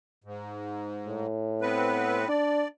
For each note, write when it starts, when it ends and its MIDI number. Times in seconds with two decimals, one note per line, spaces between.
0.24 1.27 44
1.07 2.27 45
1.61 2.28 59
1.61 2.28 60
1.61 2.28 71
2.28 2.65 62
2.28 2.68 74